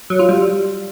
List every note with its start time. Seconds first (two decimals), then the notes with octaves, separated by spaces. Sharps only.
0.10 F#3
0.19 F4
0.29 G3